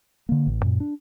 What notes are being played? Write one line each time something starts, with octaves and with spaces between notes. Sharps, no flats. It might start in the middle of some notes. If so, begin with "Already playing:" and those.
D3 A#3
A1
F#2 A#2
D4